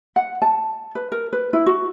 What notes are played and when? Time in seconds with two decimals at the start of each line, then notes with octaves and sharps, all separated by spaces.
0.16 F#5
0.42 A5
0.95 B4
1.12 A#4
1.33 B4
1.53 E4
1.66 F#4